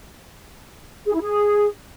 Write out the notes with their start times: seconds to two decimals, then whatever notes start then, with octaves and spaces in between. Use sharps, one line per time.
1.06 G#4
1.14 E4
1.22 G#4